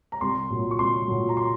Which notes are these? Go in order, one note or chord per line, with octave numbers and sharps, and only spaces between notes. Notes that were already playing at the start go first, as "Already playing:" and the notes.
A#5
C2 C6
A#2 F#3
C#6
C2 C6
A#2 F#3
A#5
C6